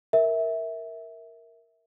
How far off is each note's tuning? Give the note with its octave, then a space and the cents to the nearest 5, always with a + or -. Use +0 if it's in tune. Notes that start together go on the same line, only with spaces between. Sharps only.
A#4 +0 E5 -15